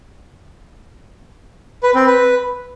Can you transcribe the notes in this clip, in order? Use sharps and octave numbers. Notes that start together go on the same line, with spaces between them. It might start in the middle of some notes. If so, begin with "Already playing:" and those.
B4
C4
B4